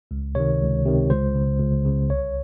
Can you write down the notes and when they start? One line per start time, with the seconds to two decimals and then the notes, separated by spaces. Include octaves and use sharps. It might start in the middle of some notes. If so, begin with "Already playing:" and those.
0.11 C#2
0.35 C3 D#3 C#5
0.61 C#2
0.85 C3 D#3
1.10 C#2 C5
1.35 C#3
1.60 C#2
1.85 C#3
2.10 C2 C#5